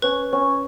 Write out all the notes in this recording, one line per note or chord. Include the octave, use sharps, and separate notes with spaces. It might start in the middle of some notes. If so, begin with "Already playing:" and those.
C#4 B4
C#4